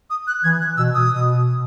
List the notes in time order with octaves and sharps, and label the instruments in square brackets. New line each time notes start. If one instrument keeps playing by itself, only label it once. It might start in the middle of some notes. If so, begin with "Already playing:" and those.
[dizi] D#6
F#6
[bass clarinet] E3 [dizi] G#6
[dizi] F#6
[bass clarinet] B2 [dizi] E6
[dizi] D#6
[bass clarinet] B2
B2